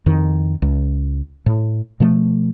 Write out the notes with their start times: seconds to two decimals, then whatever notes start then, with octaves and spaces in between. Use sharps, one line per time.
0.06 F2 D#3
0.62 C#2
1.46 A2
2.00 B2 F3 A3